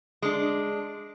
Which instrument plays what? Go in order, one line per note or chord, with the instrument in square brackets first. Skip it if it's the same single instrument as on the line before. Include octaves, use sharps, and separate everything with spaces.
[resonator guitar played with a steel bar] G#3 D4